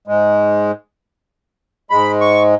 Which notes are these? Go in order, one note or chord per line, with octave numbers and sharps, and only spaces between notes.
G#2 G#3
G#2 G#3 B5
C#6